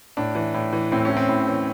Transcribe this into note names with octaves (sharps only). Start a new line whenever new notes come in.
A2 D4
E3
A2
E3
A2 C4
C#4
E3
C4
A2
E3